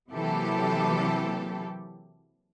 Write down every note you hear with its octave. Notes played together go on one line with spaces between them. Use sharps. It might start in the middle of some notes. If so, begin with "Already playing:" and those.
C3 E3 F#3 A#3 G4 A4